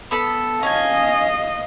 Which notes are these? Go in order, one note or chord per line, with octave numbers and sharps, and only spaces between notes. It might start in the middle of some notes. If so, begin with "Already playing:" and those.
B3 A4 B5
C#4 D#5 F5 G#5